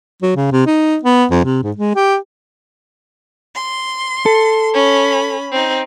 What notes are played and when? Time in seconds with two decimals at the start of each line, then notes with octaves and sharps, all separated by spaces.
0.22 F#3
0.36 C#3
0.52 C3
0.66 D#4
1.03 B3
1.31 F2
1.45 C3
1.63 G#2
1.77 G#3
1.95 G4
3.54 C6
4.26 A4
4.74 C#4 B5
5.52 C4 D#4